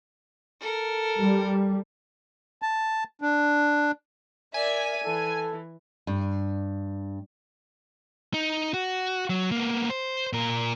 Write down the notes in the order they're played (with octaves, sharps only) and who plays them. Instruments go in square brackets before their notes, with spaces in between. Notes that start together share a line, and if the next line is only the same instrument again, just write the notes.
[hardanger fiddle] A4 A#4
[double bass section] G3
[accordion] A5
D4
[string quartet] A#4 D5 E5 [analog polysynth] G#5
[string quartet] E3 [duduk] A4
[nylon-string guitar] G2
[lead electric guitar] D#4
F#4
F#3
A#3 B3
C5
A#2 A#4